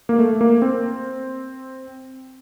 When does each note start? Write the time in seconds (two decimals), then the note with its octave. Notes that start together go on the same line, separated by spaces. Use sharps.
0.09 A#3
0.19 A3
0.41 A#3
0.62 C4